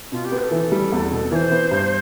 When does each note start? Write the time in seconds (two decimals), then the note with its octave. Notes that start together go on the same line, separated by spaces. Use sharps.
0.12 B2 F4
0.25 G4
0.32 B3
0.38 C5
0.43 A4
0.51 E3
0.72 G3
0.92 E2
1.11 B2
1.31 E3 C5 D5
1.51 B3
1.71 G2